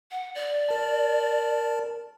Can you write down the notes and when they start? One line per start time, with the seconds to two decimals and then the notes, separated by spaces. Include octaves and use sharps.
0.11 F#5
0.35 D5
0.69 A#4 A5